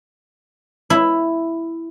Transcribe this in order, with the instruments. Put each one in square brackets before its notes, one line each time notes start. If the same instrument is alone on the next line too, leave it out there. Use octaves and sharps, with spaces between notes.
[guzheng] E4